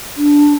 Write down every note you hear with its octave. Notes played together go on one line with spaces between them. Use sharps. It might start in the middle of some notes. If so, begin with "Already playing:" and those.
D4